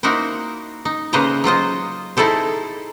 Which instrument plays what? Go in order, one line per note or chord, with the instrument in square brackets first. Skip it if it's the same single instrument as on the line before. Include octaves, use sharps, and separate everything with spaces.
[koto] A#3 D#4 E4 F#4 A#4 C5
D#4
C#3 A#3 B4 C5 D#5 A#5
F#3 F4 C5 D#5
D#4 E4 G#4 A4 C5